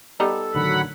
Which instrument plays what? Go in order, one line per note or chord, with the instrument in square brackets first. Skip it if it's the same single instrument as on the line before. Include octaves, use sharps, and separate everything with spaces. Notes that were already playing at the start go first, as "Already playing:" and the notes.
[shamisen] G3 B3 D#4 [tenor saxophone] A4
[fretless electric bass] A1 D3 D#3 [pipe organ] F#3 F#5 B5